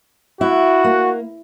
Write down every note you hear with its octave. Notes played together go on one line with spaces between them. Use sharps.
E4 F#4
A#3